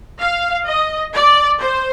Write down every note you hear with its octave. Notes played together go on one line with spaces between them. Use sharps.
F5
D#5
D5
C5